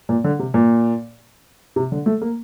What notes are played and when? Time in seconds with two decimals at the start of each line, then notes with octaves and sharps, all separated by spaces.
0.09 A#2
0.24 D3
0.39 C3
0.54 A#2
1.76 C3
1.92 D3
2.06 A3
2.22 A#3